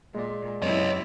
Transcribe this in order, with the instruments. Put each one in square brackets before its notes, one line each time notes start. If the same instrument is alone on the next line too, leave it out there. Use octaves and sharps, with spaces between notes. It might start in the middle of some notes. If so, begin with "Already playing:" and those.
[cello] A#2 [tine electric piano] G#3 D5
[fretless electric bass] F#2 [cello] C3 E4 [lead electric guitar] C#5 D#5